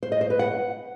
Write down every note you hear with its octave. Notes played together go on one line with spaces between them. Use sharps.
C5
D#5
C5
B4
F#5